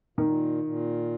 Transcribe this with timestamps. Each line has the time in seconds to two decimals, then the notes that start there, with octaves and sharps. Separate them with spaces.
0.18 A#2 D#3
0.64 A#2